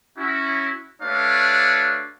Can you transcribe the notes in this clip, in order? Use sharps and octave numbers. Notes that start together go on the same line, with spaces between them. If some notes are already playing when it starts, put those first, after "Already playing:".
C#4 E4 F#4
A3 D4 F#4 B4 C#5 F5